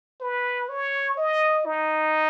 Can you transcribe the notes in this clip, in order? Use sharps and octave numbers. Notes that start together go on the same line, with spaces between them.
B4
C#5
D#5
D#4